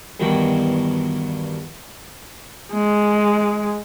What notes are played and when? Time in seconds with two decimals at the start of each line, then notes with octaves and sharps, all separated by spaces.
0.20 E2 G2 D#3 F#4 G5
2.72 G#3